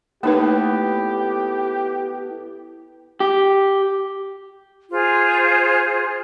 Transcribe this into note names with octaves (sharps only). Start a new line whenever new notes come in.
A2 A#3 B3 D#4 G4 B4
G4
F4 G#4 C5